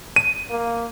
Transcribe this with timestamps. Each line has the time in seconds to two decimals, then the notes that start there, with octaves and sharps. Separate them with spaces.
0.16 D#7
0.50 A#3